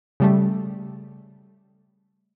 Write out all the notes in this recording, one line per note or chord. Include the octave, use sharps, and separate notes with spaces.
C#3 G3 A3